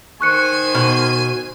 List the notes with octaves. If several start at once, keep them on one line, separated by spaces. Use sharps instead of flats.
D#3 C5 G#5 C#6 F#6 C#7
B2 F6